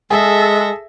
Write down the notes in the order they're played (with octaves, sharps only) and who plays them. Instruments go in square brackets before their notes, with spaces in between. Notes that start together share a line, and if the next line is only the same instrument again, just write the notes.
[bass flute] G#3 [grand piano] G#4 [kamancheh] A4 [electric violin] E5 A#6